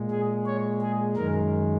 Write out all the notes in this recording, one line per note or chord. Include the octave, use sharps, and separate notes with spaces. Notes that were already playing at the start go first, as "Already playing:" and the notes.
Already playing: A#2 G#3
G#4
C#5
G#4
F#2 D#3 G#3 A#4